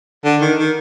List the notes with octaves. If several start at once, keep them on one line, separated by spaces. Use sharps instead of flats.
D3
D#3
D#3